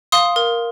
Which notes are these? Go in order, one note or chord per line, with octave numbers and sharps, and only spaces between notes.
F5 C6 D#6
A#4